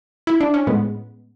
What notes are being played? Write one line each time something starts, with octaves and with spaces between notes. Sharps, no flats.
E4
D4
C#4
A2 G#3 B3